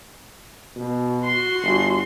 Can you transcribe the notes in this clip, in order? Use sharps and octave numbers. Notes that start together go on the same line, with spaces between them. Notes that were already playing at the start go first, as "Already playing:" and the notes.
B2
F#4 C6
G1